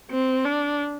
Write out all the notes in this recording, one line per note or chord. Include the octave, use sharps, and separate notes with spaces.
C4
D4